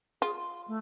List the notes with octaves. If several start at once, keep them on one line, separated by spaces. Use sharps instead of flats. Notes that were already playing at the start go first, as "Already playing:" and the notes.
F4 G#4
C6
A3